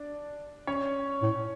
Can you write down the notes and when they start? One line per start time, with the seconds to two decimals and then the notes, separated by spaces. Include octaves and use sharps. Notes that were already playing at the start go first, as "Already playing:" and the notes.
Already playing: D4 D5
0.67 C#4 C#5
1.22 A2